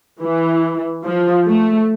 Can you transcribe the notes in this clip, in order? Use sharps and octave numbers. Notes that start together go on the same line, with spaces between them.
E3
F3
A3